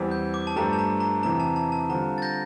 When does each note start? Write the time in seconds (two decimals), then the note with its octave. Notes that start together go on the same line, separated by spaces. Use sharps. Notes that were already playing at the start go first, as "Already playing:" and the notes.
Already playing: E2 E3 G3 C4
0.11 G6
0.34 D6
0.47 A5
0.56 G2 F3 A3 D4 G4 A#5
0.73 A5
0.79 A#5
1.00 A#5
1.23 E2 C3 E3 A#5
1.40 A5
1.56 A5
1.72 A5
1.89 D3 G3 C4 F4 A#5
2.18 A6
2.22 G6 A#6